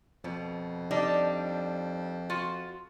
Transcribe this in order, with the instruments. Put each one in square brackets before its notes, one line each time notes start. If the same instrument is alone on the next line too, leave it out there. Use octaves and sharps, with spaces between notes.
[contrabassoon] F2 [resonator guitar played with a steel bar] B2
[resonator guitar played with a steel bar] G3 D4 D#4
F4 F#4